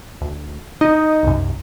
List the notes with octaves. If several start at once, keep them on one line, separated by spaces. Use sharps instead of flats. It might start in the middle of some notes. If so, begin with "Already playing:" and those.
D2
D#4 D#5
C2 F#2